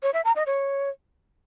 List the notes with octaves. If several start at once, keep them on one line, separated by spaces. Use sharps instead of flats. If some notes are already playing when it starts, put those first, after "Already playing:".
C#5
E5
A#5
D#5
C#5